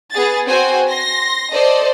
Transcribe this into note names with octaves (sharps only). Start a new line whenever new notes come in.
B3 G#4 A6
C4 F#4 C5 G5 G#5
C6 A#6
A4 C5 D5 D#5